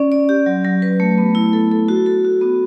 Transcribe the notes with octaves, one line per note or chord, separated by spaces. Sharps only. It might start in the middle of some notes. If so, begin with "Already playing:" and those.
Already playing: C#4 D5
D5
G4
F#3
F#3
B4
A3
B3
E4
A4
A4
F#4
A4
F#4
B3